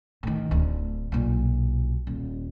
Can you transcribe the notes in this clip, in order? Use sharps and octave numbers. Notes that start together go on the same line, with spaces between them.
A2 D#3
D1 D2
B1 A#2
D#1